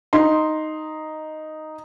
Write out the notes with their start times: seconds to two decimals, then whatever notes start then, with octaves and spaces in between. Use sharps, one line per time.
0.13 D#4 C6